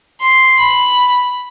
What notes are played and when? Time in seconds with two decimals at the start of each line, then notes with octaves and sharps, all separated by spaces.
0.21 C6
0.58 B5